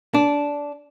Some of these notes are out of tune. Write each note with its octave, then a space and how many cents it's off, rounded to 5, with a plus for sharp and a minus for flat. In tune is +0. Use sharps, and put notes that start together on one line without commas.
D4 -15